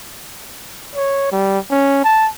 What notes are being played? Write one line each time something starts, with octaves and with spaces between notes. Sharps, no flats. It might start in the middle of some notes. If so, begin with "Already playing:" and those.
C#5
G3
C#4
A5